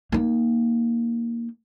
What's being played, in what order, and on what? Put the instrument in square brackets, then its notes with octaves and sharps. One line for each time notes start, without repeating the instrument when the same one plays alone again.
[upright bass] A#3 D#4